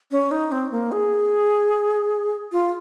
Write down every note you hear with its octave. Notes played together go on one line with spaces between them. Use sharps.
C#4
D#4
C4
A#3
G#4
F4